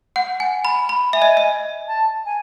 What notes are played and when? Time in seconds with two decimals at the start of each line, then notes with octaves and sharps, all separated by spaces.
0.16 F#5
0.40 G#5
0.65 B5
0.89 B5
1.13 E5 G#5
1.22 D#5
1.37 D#5
1.87 A5
2.25 G#5